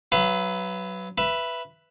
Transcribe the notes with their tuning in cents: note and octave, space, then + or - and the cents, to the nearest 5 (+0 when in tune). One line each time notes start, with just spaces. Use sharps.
F#3 +15 B4 +15 F5 -40
B4 +0 E5 +15